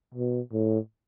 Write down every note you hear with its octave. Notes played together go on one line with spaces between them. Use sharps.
B2
A2